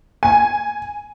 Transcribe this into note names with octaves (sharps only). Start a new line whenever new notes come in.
G#5